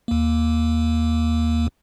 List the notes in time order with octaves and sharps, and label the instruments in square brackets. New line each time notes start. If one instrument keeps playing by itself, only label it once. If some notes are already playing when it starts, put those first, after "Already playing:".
[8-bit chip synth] D#2 A#3